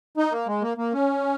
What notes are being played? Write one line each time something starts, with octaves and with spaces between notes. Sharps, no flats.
D#4
A#3
G#3
A#3
A#3
C#4